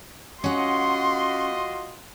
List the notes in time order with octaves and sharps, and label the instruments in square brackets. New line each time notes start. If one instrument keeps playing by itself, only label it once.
[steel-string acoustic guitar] C#4 F#5 [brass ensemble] F4 F#4 D#5 [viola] C6